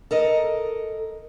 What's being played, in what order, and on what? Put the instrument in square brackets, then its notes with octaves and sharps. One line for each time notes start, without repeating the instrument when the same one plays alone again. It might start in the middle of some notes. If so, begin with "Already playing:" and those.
[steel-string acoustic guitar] A4 A#4 D#5